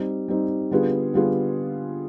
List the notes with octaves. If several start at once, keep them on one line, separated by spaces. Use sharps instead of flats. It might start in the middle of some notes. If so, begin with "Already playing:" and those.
Already playing: G3 C4 D#4
G3 C4 D#4
D3 G3 B3 F4 G#4
D3 G3 B3 F4 G#4